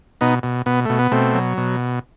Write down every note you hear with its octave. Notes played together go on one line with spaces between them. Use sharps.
B2 B3 D#4
B2
B2 B3
B2 A3
B3
B2 A3 C4
F#3
B2